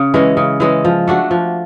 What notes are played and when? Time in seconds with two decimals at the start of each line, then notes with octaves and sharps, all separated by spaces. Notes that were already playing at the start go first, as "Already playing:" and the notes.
Already playing: C#3
0.14 E3 G#3 C#4
0.37 C#3
0.60 E3 G#3 C#4
0.84 F3
1.07 A3 D4 F#4
1.31 F3